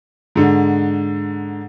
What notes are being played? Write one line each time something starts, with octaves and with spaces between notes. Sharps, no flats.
G#2 D3